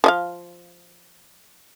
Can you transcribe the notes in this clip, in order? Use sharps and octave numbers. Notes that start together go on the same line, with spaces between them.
F3 D#5 F5